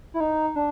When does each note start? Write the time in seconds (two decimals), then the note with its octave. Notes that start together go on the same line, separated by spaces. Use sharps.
0.14 E4
0.20 D#4
0.56 D4